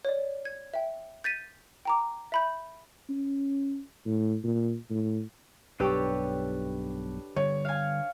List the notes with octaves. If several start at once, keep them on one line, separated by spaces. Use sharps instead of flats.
C#5 D5
G#6
E5 G5
G6 A6 B6 D#7
G5 A#5 D6
E5 B5 G6
C#4
A2
A#2
A2
B1 G2 D4 G4 A4 B4 C#5 E6
D3 G3 C#5
F5 G#5